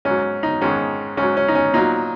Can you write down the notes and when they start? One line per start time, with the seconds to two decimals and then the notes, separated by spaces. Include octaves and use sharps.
0.05 G#2 F#3 C#4
0.43 D#4
0.61 G#2 D#3 G#3 C#4
1.17 G#2 C#4
1.23 F#3
1.37 C#4
1.48 D#4
1.55 C#4
1.73 A#2 F#3 D#4